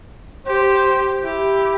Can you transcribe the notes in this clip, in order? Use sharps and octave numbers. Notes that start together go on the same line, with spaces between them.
G4 C5
E4 G4